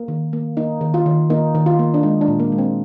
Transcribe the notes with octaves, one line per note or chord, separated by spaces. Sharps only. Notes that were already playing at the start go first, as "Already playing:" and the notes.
Already playing: A#3
D#3
A#3
A#3 D#4
D#3
F4
D#3
A#3 D#4
D#3
F4
A#3
D4
G#3 D#4
D4
A#2
A#3
G#3
C4